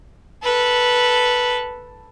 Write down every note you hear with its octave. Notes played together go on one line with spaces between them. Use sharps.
A4 B4